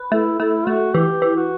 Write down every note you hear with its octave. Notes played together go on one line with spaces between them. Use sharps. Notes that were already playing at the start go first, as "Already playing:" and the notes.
Already playing: B4
A3 E4
A3 E4
A3 F#4
E3 G4
E3
F#4